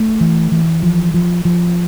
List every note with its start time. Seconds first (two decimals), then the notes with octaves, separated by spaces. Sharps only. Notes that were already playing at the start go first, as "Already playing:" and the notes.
Already playing: A3
0.21 E3
0.52 E3
0.83 F3
1.14 F3
1.45 F3